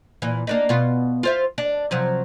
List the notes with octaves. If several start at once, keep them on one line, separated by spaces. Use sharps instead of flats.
A#2 E3
A#3 D4 D#4
B2 B3 F4
F4 C5 E5
D4
C3 F3 F#3